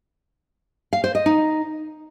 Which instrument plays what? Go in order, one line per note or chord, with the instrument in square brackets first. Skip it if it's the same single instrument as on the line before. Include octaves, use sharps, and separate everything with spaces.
[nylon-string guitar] F5
C5
D#5
D#4